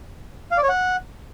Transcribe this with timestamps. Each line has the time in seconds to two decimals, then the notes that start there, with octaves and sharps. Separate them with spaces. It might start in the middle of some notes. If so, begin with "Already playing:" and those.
0.51 F5
0.57 D5
0.63 C#5
0.69 F#5